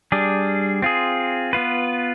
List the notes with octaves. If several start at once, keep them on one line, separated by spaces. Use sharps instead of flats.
G3 D4 G#4
C4 F4 G#4
B3 F4 B4